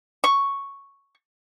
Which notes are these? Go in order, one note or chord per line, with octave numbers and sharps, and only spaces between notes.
C#6